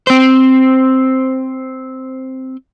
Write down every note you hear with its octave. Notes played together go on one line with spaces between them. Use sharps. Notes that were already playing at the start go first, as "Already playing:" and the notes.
C4 C5